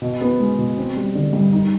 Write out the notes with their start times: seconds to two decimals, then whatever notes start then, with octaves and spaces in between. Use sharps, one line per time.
0.02 B2
0.21 B3
0.40 G#3
0.58 B2
0.77 C4
0.96 G3
1.15 D3
1.33 G2
1.52 D#4